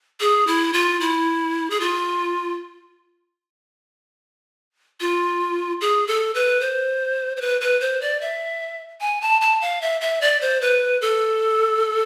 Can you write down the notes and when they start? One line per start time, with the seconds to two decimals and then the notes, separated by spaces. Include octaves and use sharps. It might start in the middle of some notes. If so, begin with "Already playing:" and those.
0.20 G#4
0.47 E4
0.73 F4
1.01 E4
1.70 G#4
1.80 F4
5.01 F4
5.81 G#4
6.07 A4
6.35 B4
6.61 C5
7.37 C5
7.41 B4
7.61 B4
7.81 C5
8.01 D5
8.21 E5
9.01 G#5
9.22 A5
9.41 A5
9.61 F5
9.82 E5
10.01 E5
10.21 D5
10.41 C5
10.61 B4
11.01 A4